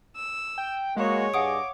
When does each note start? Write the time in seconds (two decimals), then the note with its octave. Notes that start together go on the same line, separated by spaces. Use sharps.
0.15 E6
0.58 G5
0.97 G#3 A#3 F#4 C#5
1.34 G2 G#4 D#5 F5 F#5 D6 D#6